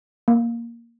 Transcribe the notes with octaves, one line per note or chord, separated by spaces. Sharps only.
A#3